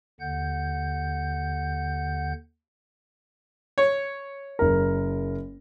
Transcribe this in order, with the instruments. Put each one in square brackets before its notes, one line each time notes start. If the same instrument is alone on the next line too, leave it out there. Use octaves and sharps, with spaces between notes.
[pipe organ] D#2 D3 F#5 G6
[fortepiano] C#5
[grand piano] F#1 A#4